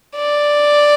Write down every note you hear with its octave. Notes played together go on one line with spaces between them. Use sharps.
D5